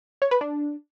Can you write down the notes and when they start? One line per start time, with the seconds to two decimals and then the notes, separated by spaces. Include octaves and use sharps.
0.22 C#5
0.31 B4
0.41 D4